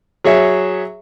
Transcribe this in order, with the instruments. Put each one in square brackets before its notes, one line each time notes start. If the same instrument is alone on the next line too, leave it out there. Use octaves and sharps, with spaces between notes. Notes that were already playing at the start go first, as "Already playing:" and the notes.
[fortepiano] F#3 G#4 C#5 E5